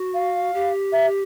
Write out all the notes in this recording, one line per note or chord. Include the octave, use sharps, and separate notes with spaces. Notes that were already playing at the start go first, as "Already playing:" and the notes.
Already playing: F#4
F5
G4
E5